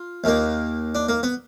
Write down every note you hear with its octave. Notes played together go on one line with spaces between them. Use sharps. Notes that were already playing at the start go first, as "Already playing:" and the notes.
Already playing: F4
D#2 D#3 A#3
D4
A#3
B3